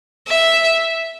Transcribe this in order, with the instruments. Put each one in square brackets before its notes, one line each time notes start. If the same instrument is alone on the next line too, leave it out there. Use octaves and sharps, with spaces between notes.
[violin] E5